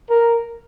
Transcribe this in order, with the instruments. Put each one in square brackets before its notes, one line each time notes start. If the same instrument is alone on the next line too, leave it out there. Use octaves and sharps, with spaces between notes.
[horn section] A#4